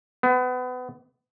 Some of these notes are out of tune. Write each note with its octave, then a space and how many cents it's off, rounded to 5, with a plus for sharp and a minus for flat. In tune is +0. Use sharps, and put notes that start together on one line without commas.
B3 +30